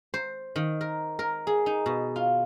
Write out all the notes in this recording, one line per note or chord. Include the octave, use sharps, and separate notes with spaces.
C5
D#3
A#4
A#4
G#4
D#4
B2
F4